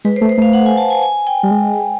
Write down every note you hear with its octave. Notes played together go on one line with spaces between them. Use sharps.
G#3 B4
C5
A3
C5
A3 F5
F#5
G#5
A5
G#5
G#5
G5
G3
G#3